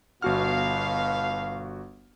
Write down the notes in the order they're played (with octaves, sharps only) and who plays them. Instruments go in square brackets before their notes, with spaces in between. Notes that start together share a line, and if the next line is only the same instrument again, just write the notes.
[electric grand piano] G1 F#4 F6 [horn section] B2 F5